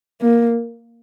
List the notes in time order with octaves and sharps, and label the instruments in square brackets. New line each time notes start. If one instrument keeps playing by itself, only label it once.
[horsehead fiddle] A#3